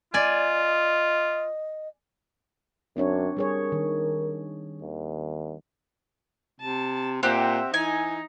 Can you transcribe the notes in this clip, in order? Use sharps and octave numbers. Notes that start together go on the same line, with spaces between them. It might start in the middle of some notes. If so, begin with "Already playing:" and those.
F4 D5 D#5 G#5
F#2 C4 D4 C#5
G3 G#4 A#4 C#5
D#3
D#2
C3 A5
A#2 C4 G4 E5 F#5
E3 D#4 G#5